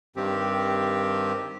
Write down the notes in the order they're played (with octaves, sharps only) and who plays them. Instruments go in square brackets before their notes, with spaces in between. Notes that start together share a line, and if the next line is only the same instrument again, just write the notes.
[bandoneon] G2 D#3 C4 G4